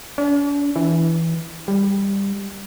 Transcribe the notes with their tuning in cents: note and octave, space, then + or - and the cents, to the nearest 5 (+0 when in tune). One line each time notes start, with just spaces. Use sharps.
D4 -45
E3 -5
G3 +15